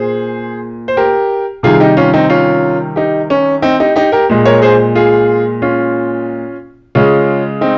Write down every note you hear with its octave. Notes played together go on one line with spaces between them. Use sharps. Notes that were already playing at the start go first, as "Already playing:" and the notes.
Already playing: A#2 G#4 C5
C5
G4 A#4
C3 D#3 G3 F4 G#4
D#4 G4
C#4 F4
C4 D#4
C#4 F4
D#4 G4
C#4
C4 D#4
D#4 G4
D#4 G4
G4 A#4
A#2 G#3
A#4 C#5
G#4 C5
F4 G#4
C#4 F4
C#3 G#3 C#4 F4
C4 D#4